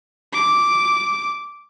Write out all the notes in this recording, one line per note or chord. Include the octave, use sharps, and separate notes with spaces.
D6